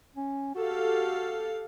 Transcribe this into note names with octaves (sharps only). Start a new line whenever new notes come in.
C#4
F#4 G4 A4 F5